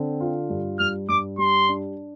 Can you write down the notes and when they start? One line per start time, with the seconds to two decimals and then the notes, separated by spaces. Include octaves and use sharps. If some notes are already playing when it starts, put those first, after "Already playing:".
Already playing: D3 C4
0.20 F4
0.50 G2
0.79 G2 F6
1.09 G2 D6
1.38 G3 C6
1.69 D4